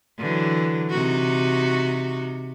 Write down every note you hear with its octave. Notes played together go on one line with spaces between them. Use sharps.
D3 E3 F#3
C3 D#4 F#4